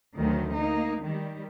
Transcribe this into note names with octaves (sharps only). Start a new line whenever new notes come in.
D2 D#3 F#3
A#3 D#4
D#3 G3